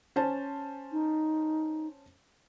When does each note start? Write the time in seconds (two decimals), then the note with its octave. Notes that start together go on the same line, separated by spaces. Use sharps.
0.16 C#4 C5 A5
0.92 D#4